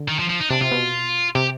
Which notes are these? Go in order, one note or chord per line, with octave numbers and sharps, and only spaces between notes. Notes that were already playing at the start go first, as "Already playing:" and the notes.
Already playing: D3
D#3
F3
F3
D#4
C3 D4
C3 F4
B2
C3 G4